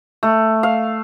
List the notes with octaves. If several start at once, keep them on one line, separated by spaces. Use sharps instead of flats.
A3
F5